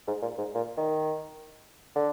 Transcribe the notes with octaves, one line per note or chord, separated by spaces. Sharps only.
G#2
A#2
G#2
A#2
D#3
D3